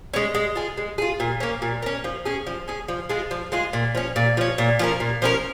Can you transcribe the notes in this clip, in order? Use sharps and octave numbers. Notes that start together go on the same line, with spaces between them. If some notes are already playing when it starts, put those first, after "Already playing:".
G#3 C#4
G#3
F4 G#4
G#3
F4 G#4
A#2
A#3 C#4
A#2
A#3 C#4
F3
C#4 G#4
F3
C#4 G#4
F3
G#3 F4 G#4
F3
G#3 F4 G#4
A#2
F3 C#4
A#2
F3 C#4
A#2
F3 C#4 A#4
A#2
F3 C#4 A#4